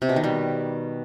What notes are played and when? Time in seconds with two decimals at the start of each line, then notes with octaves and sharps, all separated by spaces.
0.02 C3
0.09 B2
0.16 D#3
0.24 G3